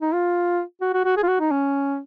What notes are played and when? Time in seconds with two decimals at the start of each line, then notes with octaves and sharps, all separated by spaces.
0.02 D#4
0.13 F4
0.81 F#4
0.93 F#4
1.05 F#4
1.17 G#4
1.23 F4
1.28 F#4
1.40 D#4
1.51 C#4